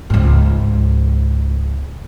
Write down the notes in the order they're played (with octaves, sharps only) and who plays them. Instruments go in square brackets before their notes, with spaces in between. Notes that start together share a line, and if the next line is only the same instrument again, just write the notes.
[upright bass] C#2 G#2